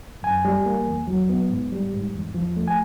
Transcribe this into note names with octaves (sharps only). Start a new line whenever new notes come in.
F#2 G#5
G3
A#3
E2
F#3
B3
G#2
G3
G#2
E2
F3
A3
G#5